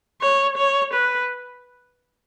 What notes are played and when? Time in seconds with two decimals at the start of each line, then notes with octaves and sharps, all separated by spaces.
0.21 C#5
0.57 C#5
0.93 B4